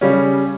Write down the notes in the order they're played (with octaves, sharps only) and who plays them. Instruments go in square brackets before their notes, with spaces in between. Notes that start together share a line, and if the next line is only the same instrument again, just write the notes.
[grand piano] C#3 G3 C#4